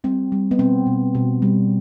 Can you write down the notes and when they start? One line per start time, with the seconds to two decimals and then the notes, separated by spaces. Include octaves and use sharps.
0.04 G3 C4
0.32 G3
0.51 B3
0.59 B2 C4
0.87 B2
1.15 B2
1.42 G3